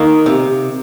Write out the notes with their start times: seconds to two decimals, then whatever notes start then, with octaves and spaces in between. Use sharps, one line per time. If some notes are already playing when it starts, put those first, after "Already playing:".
Already playing: D#3 A#3
0.26 C3